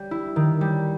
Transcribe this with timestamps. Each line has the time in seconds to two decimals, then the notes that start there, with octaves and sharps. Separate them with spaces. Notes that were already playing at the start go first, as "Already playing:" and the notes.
Already playing: G3
0.11 E4
0.36 D#3
0.61 G3